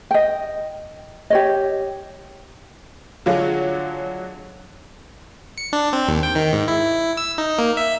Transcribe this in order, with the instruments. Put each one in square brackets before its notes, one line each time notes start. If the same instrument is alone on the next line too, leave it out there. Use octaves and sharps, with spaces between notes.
[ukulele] D#5 G5
G4 C#5 D#5
[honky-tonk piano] D3 F#3 G#3 [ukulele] F4
[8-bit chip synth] C#7
D4
C4
D#2
G5
D#3
G#2
E4
E6
D#4
A#3
E5